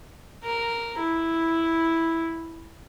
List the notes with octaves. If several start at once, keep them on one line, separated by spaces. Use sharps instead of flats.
A#4
E4